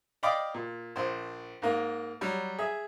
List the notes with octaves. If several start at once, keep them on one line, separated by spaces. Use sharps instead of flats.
D5 D#5 F5 G5 B5 D6
A#2
A#1 C5
G#2 A#3
F#3 G3
G#4 E5